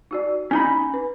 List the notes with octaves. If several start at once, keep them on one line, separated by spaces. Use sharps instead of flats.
D#4 F#4 D5
C#4 D#4 G#5 B5
B4